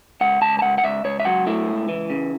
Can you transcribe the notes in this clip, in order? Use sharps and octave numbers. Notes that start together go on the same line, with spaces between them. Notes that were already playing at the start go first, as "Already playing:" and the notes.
C#2 F#5
C#2 A5
A5
C#2 F#5
F#5
C#2 E5
C#2 C#5
E5
F#3 F#5
A3 E4
C#2
E3
C#3